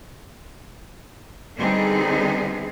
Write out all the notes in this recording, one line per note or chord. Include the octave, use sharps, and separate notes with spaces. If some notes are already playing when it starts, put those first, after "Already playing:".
D3 G3 B3 C4 D#4 G#4